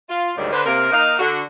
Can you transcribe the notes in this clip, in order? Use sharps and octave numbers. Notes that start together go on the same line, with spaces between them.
F4
D2 G#2 D#3 F#3 G3 D5
D3 B4 C5
C3 A#3 A#4
A#3 D#4 F5
D3 F#4